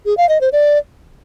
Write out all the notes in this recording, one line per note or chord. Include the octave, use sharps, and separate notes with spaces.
G#4
F5
D#5
C5
D5